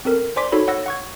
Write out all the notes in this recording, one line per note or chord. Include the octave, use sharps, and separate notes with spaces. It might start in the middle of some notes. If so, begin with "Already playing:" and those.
C4 A4 A#4
C5 D5 G#5 C6 D6 B6
D#4 F#4 A4 C#5 B5
C#5 F#5 E6 A#6
F#5 C#6 G#6